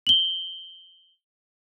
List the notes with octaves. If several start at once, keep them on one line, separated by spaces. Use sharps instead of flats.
F#7 G7